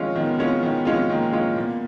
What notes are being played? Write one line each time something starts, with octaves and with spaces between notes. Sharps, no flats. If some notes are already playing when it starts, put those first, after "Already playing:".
Already playing: D#3 G#3 C#4 F4
D#3 B3
G#3 C#4 F4
D#3
G#3 C#4 F4
D#3 A#3
G#3 C#4 F4
A#2 B3